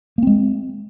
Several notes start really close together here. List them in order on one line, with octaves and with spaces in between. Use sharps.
A#3 C4 G#3